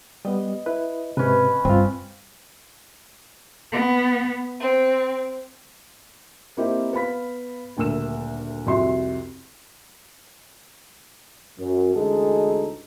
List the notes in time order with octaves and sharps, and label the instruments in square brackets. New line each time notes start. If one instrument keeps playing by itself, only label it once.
[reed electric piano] G3 B3 [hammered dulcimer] D#5
[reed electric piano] E4 B4
[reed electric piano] G#2 C3 [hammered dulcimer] C#4 B4
[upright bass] G2 [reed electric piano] C4 F4
[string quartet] B3
C4
[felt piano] A#3 C4 D#4 E4 G4 A#4
B3 F5 B5 B6
D#1 D2 A3 A#4 E6 E7
C2 F2 F#4 E5 C6
[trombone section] F#2
A1 D2 G#3 D#4 G#4 A4